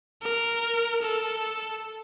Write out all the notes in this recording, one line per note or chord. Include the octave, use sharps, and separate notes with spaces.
A#4
A4